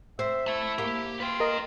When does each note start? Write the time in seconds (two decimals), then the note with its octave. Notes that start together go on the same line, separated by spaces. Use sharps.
0.19 C4 E5
0.47 E4 E5 A5
0.78 A#3 G4
1.20 F4 B4 G5
1.40 A#4 D#5